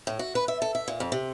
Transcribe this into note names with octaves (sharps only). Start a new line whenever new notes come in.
A2
F#4
B4
E5
A4
E5
A#2
F2
C3